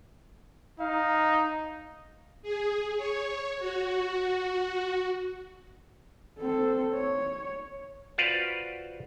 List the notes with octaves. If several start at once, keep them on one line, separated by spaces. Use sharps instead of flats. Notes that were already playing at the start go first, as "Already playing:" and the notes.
D#4 F5
G#4
C#5
F#4
C4 A4
C#5
F4 F#4 B4 C5 D5 F5